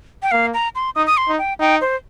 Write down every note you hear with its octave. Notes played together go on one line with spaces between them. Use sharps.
G5
A#3 F5
A#5
C6
D#4 D#6
D#6
C6
D#4
G5
D#4 G5
C5